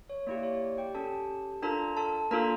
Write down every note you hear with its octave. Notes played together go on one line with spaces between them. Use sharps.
C#5
A#3 E4 G4 D5
C#5
D5
G4 G5
C#4 G4 A4 A5
D4 F4 A4 A#4 A#5
A4 A5
A#3 D4 F4 A4 A#4 A#5